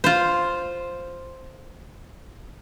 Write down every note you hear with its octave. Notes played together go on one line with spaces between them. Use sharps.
F4 C5